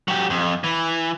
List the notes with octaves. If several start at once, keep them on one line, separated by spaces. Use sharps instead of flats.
F#3 G4
F2
E3